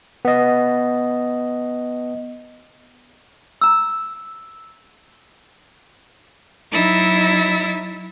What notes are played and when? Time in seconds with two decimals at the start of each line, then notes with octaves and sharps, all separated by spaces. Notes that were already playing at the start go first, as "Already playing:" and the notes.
0.25 B3 D#5
3.61 A#5 E6
6.71 F#3 D#4 E4 E6 A6 A#6